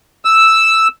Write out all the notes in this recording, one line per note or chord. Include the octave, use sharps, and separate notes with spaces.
E6